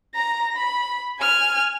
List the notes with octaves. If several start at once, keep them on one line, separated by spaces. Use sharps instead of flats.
A#5 A#6
B5
G#5 F6